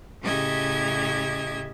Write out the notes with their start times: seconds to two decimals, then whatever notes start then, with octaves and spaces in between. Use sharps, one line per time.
0.22 A2 C#3 G4 D#5 E5 G#6